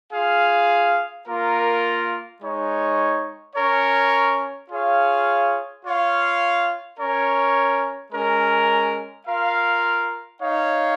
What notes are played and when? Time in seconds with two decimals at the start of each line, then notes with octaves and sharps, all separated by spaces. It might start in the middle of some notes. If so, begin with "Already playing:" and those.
0.12 F4 G#4 F5
1.27 A#3 F4 A#4
2.40 G#3 D#4 C#5
3.56 C#4 A#4 C#5
4.69 F4 G#4 C#5 F5
5.84 F4 C#5 F5
6.99 C#4 A#4 C#5
8.12 G#3 C#4 A#4
9.27 F4 A#4 F5
10.42 D#4 C#5 F5